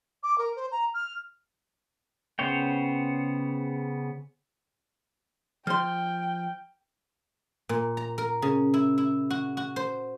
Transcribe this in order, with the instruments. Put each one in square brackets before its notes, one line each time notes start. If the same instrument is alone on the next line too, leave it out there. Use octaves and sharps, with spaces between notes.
[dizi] D6
A#4
C5
A#5
F6
[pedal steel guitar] C#3 B3 C5 C#5 G5
[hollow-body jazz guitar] F3 C6 [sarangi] G5 [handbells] F6
[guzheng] A#2
A#5
A#4
C#3
E4
E4
F#4
F#4
C5